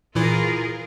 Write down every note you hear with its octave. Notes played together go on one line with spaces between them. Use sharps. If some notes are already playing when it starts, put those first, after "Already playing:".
A#2 E3 E4 F4 G#4 A#4